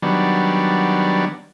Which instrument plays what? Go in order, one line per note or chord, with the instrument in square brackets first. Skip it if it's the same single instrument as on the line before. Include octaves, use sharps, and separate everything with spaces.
[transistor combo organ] D#3 F#3 G3 B3 D4